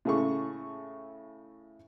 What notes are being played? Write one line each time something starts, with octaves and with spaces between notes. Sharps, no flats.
A2 C#3 G#4 A4 C#6